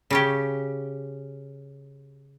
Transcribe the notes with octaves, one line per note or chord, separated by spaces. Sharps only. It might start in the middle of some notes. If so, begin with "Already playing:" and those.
C#3 C#4 G4